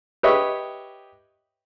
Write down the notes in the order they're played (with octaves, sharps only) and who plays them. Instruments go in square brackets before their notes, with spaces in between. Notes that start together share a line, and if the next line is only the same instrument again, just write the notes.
[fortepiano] G4 B4 C#5 D#5 E5